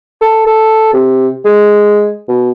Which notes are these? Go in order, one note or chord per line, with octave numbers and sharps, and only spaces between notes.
A4
A4
C3
G#3
B2